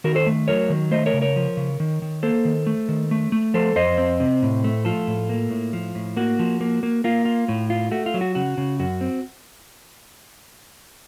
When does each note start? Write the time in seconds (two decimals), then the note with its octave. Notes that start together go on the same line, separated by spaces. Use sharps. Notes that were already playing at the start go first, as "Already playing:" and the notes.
0.04 D#3 F#4 A#4
0.15 A4 C5
0.26 A3
0.48 F#3 A#4 C#5
0.70 D#3
0.91 A3 C5 D#5
1.06 A#4 C#5
1.14 C#3
1.22 A#4 C#5
1.36 F3
1.57 C#3
1.80 D#3
2.02 D#3
2.23 A#3 A4 C5
2.45 D#3
2.67 A3
2.89 D#3
3.11 A3
3.32 A3
3.54 F3 A4 C5
3.76 F2 C5 D#5
3.98 C4
4.20 C3
4.42 A2
4.64 A3
4.85 F3 F4 A4
5.07 A2
5.29 A#3
5.51 A2
5.73 F3
5.95 A2
6.17 A#3 F#4
6.39 F3
6.61 A#3
6.83 A#3
7.04 A#3 F4
7.25 F4
7.48 A2
7.70 F4
7.91 A3 F#4
8.06 F4
8.14 F#3
8.21 F#4
8.35 C#3 F#4
8.58 C#3
8.79 F#2 F#4
9.01 C4